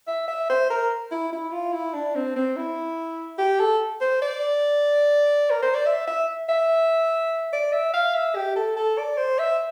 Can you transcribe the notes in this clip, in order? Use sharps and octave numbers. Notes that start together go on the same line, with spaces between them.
E5
E5
C5
A#4
E4
E4
F4
E4
D4
C4
C4
E4
G4
A4
C5
D5
A#4
C5
D5
E5
E5
E5
D5
E5
F5
E5
G4
A4
A4
D5
C5
E5